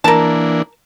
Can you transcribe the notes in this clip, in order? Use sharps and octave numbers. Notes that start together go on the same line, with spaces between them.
E3 A#3 D4 A#4 A5